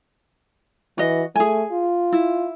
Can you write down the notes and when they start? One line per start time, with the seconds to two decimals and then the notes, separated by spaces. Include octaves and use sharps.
0.98 E3 F#4 D#5
1.36 A3 G#4 G#5
1.72 F4
2.13 E4